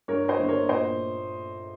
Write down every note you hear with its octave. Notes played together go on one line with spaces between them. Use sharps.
G2 A#4 C#5
C5 D#5
G1
A#4 C#5
A#2 C5 D#5